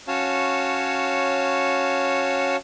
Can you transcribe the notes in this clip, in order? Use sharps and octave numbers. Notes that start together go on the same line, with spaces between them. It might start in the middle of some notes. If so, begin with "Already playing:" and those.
C#4 F#4 C#5 F5 A5